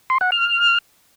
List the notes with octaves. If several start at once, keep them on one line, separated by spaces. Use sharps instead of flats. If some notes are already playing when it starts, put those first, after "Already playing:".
C6
F#5
F6